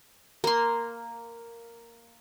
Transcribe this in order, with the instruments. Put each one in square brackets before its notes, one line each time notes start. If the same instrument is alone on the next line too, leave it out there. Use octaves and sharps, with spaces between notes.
[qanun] A#3 C6